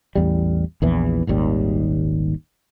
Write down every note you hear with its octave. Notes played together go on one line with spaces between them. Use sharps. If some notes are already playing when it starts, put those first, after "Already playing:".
A1 E2 G3
A#1 E2 E3
D#1 G#1 D#2 G3